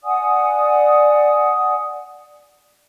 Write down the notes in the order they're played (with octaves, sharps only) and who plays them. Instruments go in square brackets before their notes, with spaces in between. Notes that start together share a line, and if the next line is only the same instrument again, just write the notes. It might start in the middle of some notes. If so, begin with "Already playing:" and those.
[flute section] D5 F#5 G#5 D#6